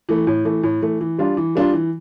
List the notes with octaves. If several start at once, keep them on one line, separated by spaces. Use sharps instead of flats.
E3 A3
A2
E3 A3
A2
E3 A3
E3
G3 D4 F4
E3
G3 D4 F4
E3